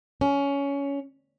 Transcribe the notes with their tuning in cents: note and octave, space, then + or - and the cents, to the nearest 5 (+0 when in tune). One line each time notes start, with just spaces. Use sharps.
C#4 +15